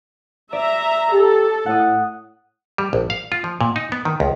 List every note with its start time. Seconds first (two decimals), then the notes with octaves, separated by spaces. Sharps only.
0.53 D5 E5 A#5
1.13 G4 A4
1.66 A2 F#5 D#6
2.78 G3
2.93 A#1
3.10 F5
3.32 F4
3.44 F3
3.61 A#2
3.76 D#4
3.92 B3
4.05 D#3
4.20 C#2